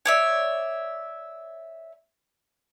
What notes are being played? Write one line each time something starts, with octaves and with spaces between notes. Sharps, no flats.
C#5 D5 E5